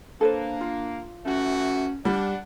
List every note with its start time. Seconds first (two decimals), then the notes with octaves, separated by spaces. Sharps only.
0.21 A#3 D4 A4 B4 C5
0.61 F4
1.26 E3 A3 C#4 F#4
2.05 G3 D4 F#5